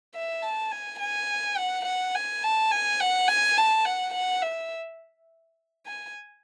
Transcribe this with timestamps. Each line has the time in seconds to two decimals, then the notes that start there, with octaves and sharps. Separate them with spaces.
0.15 E5
0.43 A5
0.72 G#5
1.00 G#5
1.57 F#5
1.85 F#5
2.15 G#5
2.44 A5
2.72 G#5
3.00 F#5
3.28 G#5
3.58 A5
3.85 F#5
4.14 F#5
4.42 E5
5.86 G#5